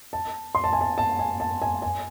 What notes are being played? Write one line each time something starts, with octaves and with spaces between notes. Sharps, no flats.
A5
C6
A5
G#5
A5
A5
G#5
A5
G#5
G#5